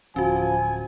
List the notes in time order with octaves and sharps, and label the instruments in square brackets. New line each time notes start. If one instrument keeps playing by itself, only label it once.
[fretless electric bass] D1 [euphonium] F3 [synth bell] C#4 F#4 [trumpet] G#5